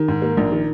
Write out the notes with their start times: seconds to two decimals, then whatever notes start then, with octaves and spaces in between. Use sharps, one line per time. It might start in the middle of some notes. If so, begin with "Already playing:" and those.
Already playing: D#3
0.08 G#2
0.22 A#3
0.37 A#1
0.52 D#3